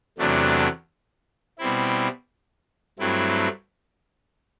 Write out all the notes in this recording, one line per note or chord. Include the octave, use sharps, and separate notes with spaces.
E2 C3 F#3 A3 D4
B2 G3 C4 E4
G2 F#3 A3 C4 E4